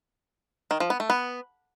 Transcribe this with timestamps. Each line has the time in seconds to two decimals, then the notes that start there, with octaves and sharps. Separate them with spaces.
0.71 D#3
0.80 F3
0.90 B3
1.00 A3
1.10 B3